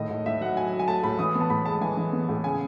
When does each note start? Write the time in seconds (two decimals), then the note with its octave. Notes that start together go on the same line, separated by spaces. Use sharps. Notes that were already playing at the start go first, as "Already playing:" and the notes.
Already playing: A2 D#3 D#5
0.10 A2
0.26 A2 E5
0.41 F#3 F#5
0.57 F#3 G#5
0.73 F#3
0.79 G#5
0.88 A3 A5
1.03 A2 B5
1.19 E3 D#6
1.35 B3
1.41 A5
1.50 A2 B5
1.66 G#3 A5
1.81 E3 G#5
1.97 E3
2.13 B3
2.29 A2
2.44 C#3 G#5